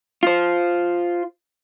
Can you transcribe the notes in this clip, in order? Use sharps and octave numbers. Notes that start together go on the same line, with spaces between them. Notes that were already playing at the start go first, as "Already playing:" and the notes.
F4 C5